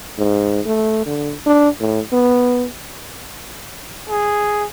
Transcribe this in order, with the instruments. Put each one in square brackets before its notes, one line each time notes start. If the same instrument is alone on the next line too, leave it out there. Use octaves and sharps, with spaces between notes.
[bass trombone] G#2
A3
D3
D4
A2
B3
[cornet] G#4